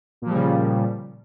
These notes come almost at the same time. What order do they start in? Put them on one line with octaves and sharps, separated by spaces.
A#2 F3 G3 C#3